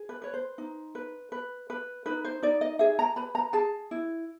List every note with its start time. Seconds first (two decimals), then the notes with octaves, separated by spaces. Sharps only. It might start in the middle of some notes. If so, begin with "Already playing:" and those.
Already playing: G#4
0.09 B4
0.22 B4 C#5
0.34 C5
0.58 D#4
0.95 B4
1.32 B4
1.70 B4
2.06 D#4 B4
2.25 C5
2.43 D#4 D5
2.61 D#5
2.79 G#4 E5
2.99 A#5
3.16 B4 B5
3.35 A#5
3.53 G#4 A5
3.91 E4